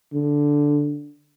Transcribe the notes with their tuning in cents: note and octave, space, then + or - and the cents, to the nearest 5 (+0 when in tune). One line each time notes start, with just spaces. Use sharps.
D3 -5